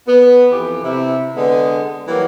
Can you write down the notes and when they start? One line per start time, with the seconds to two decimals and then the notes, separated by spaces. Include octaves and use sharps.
0.07 B3
0.51 F2 E3 G4
0.84 C3 E4
1.36 D3 G#3 B3
2.07 E3 F#3 G3 A#3